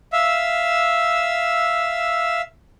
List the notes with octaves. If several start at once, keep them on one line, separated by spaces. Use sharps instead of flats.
E5 F5 E6